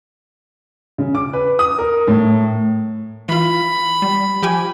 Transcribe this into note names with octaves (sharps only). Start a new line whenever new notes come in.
C#3
D6
B4
D#6
A#4
A2
E3 F4 B5
G3
F3 G4 G#5